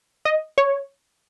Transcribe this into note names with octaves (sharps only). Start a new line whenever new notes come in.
D#5
C#5